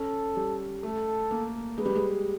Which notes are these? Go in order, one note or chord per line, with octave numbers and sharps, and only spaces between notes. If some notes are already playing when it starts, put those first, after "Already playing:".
Already playing: C#4 A4
G3
A3 A4
A#3
G#3 B4
G3
G#3